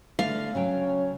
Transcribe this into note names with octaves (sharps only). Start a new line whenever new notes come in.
D3 A3 F5
C#3 F#3 C#4 G5